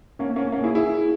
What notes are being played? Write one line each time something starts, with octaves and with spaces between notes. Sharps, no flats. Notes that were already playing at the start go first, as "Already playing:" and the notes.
A#3 C#4
A#3 C#4
A#3 C#4
E4 G#4
E4 G#4